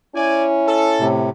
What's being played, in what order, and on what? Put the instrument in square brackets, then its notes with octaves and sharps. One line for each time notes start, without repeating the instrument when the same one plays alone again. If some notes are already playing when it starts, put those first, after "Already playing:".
[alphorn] C#4 [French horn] E4 [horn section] D5 G#5
[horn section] A4
[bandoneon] A2 C3